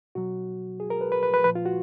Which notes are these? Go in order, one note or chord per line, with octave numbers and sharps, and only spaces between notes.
B2 F#3 F#4
G#4
A#4
B4
B4
B4
B4
A#2 F3 B4
F4
F#4